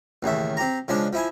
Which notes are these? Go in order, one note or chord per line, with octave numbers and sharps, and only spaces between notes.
A1 D#2 C#3 E5
C4 G4 A#5
C#3 F3 G#3 D4
F3 E4 G#5